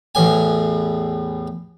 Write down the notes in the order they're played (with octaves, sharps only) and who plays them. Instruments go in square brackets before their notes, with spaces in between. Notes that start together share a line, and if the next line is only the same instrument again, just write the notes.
[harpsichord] A1 E2 A2 G#5